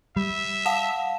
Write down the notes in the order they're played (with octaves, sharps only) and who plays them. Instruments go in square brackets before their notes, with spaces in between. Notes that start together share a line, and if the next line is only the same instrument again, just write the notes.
[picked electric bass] G3 [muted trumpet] E5
[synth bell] F5 F#5 E7 [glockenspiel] A5